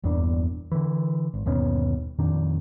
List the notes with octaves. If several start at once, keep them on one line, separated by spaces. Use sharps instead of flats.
G1 E2 A#2 D4
D3 E3
G#1
G1 D#2 B2 C#4
F2 A#2 D#3 D4